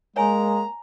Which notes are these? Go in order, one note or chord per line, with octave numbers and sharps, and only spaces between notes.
G#3 A#3 C#5 G#5 A#5